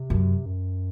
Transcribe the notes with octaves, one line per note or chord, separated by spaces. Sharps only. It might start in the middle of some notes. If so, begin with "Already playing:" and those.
Already playing: C3
F#2
F#2